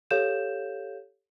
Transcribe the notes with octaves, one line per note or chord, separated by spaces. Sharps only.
G4 A4 C#5 F5 G6 E7